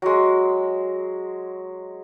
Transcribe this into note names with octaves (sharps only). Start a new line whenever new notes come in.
F#3 G#3